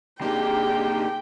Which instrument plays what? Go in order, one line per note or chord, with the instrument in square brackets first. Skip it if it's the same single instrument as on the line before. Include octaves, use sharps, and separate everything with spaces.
[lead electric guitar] C3 A#3 [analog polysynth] D4 D#4 G4 [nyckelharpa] G#4 [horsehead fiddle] G5